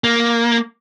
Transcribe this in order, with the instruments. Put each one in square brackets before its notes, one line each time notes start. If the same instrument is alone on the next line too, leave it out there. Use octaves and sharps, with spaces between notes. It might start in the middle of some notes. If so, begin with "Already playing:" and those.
[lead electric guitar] A#3